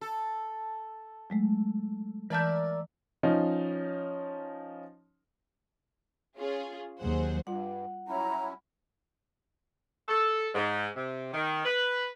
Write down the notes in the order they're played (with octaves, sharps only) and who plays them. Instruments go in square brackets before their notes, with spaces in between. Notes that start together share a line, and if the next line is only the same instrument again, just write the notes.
[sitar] A4
[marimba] F#3 G#3 A3
[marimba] E3 A5 G6 [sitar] A#4 D5 E5
[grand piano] F3 C#4 D#4
[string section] C#4 F4 G#4
D#2 F#3 G#4 C5 F#5
[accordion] G2 [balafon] G3 F4 [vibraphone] F#5
[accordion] F#3 C#4 E4 [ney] A#5
[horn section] A4
G#2
C3
D#3
B4